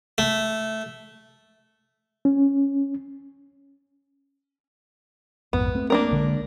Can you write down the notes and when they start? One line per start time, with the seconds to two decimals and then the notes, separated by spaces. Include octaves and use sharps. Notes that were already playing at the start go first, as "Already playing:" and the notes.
0.18 A3
2.25 C#4
5.53 A#1 F2 G#2 B3
5.75 A3 C4
5.90 A#3 D4 A#4
6.11 B1 D3 G#3